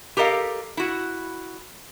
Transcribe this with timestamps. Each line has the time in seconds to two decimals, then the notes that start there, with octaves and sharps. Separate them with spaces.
0.17 G4 A4 A#4 D#5 F5
0.77 E4 F#4